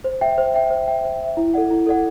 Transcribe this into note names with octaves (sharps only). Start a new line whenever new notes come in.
C5
E5 G5
C5
E5 G5
C5
E5 G5
C5
E5 G5
E4
A4 D5 F#5
E4
A4 D5 F#5